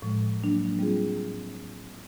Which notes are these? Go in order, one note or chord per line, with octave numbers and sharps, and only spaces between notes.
A2 F3 G#3
F#3 A#3 D4
G3 C4 F4 G#4